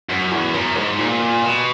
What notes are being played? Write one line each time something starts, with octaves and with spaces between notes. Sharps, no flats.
F#2
E2
F#2
G#2
A#2
B2